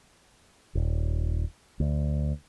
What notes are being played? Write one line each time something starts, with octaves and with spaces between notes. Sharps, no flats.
D#1
D2